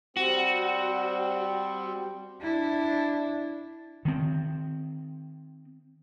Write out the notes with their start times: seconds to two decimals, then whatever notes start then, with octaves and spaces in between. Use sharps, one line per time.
0.17 G3 C4 F#4
2.42 D4 E4
4.05 D#3 C4